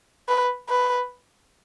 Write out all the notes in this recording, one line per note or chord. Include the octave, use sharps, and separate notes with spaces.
B4
B4